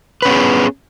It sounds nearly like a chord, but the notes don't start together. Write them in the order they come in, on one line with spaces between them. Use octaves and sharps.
B4 C#4 B3 G#4